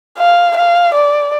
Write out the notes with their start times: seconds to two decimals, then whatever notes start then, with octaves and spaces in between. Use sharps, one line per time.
0.18 F5
0.56 F5
0.94 D5